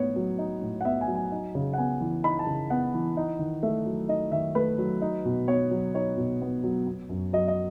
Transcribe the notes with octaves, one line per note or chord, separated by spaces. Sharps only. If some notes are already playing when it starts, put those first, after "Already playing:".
Already playing: A2 B3 D#4 C#5
F#3
D#4
A2
F#5
B3 E5
G#5
F#3
G#5
D#4
C#3
F#5
B3 G#5
E3
D#4 B5
A5
C#3
B3 F#5
E3
D#4
D#3
A3 E5
F#3
D#4 D#5
D#3 E5
A3 B4
F#3
D#4
B2
B3 C#5
F#3
D#4 C#5
B2
B3
F#3
B3
F#2
F#3 D#5
D#5